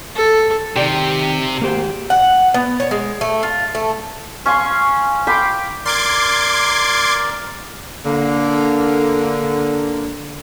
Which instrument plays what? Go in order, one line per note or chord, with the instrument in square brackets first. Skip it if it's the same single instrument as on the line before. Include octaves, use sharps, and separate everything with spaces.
[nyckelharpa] A4
[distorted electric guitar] C3 [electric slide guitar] D#3 G4 [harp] D5
[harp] G#1 G4 E7 [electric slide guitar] A#3 C5
[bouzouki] F#5
B3
C#5
G#3
A3
F4
A3
[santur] C#4 F5 C6 C#6
G5 B5 C6 D6
[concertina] A#4 D5 [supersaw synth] C6 D6 G#6
[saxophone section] D3 A#3